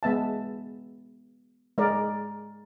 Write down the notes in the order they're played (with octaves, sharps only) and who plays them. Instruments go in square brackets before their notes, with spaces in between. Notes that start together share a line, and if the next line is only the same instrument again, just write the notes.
[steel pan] G#3 B3 E5 A5
G#3 A#4 D5